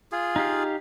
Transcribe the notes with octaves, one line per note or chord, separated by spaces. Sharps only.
F4 G#4
D#4 G4 F5